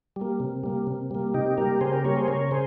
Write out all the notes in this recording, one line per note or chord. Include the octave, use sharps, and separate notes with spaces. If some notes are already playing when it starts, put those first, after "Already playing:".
G3 A#3
C3
G3 A#3
C3
G3 A#3
C3 D#4 G4
G3 A#3 G4 A#4
C#3 G#4 C5
G4 A#4
G3 A#3 A#4 C#5
G#4 C5
C#3 A#4 C#5
G#4 C5